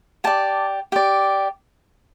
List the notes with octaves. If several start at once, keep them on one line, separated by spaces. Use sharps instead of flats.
G4 D5 A5
G4 D5